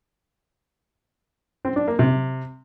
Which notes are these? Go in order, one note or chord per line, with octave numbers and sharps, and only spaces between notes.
C4
D4
A#3
C3